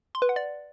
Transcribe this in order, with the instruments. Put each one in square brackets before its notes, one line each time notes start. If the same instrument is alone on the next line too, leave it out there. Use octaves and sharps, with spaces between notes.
[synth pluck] C6
B4
F#5
D5